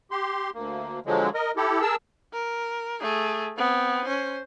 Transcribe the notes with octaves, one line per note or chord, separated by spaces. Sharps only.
G4 C6
D2 A#3
D3 F3 F#3 G#3
A#4 D#5
E4 G4 A4
G#4 A#4 A5 E6
A#4
A3 G#4
B3 C4
C#4 C5